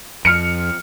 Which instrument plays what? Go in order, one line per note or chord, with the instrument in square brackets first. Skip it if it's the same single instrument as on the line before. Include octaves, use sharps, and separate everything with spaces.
[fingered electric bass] F2 [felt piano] F6 C#7